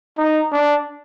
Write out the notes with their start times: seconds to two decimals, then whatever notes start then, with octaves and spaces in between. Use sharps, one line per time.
0.18 D#4
0.52 D4